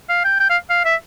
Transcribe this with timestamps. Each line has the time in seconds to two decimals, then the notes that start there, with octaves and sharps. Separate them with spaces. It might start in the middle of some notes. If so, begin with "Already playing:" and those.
0.09 F5
0.24 G5
0.40 G5
0.50 F5
0.70 F5
0.85 E5